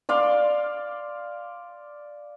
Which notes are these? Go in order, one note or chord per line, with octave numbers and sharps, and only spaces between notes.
D5 F5 C6